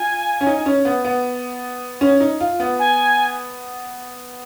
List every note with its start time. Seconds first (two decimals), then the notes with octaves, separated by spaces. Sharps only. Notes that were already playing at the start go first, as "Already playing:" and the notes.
Already playing: F4 G#5
0.41 C#4
0.47 D#4
0.66 C#4
0.85 B3
1.05 B3
2.01 C#4
2.20 D#4
2.40 F4
2.60 B3
2.79 G#5